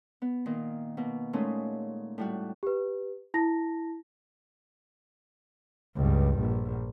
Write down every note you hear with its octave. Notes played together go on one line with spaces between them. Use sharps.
B3
A#2 D#3 A#3
B2 A#3
A#2 G#3 A3 C#4 D#4
A2 G3 F#4
G4 B4
E4 A5 A#6
C#2 G2
A#1